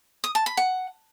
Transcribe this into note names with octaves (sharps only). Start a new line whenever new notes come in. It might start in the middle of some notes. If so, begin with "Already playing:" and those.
D#6
A5
B5
F#5